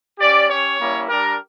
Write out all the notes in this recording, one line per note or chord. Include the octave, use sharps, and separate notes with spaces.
C#4 G4 D5
C#4 G4 C#5
G3 A#3 C#4 E4
G3 D4 G4 A#4